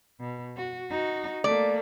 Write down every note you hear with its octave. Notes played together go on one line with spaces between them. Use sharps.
B2
F#4
D#4 F#4
A3 A#3 D5